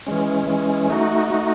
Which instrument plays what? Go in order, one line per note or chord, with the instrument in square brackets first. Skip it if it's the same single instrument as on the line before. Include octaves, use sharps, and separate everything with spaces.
[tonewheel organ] E3 G#3 C#4
E3 G#3 C#4
A3 D#4 F#4
A3 D#4 F#4